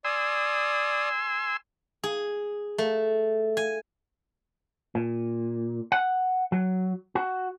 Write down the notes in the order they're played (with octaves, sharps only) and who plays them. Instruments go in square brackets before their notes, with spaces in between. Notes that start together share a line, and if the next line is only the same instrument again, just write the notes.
[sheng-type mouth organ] D5 D#6 [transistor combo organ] G#5 C6 E6
[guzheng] G#4
A3
G#5
[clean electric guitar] A#2
F#5
F#3
F#4